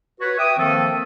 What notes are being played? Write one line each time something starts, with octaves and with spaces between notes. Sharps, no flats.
F#4 B4 C#5
E5 G5 D6 D#6
D#3 F3 A#3 C4 A4